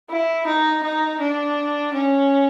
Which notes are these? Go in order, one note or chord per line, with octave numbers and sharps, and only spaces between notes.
E4
D#4
D#4
D4
C#4